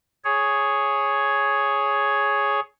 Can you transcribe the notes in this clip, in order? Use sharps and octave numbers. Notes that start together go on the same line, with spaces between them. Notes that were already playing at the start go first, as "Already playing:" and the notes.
G#4 C#5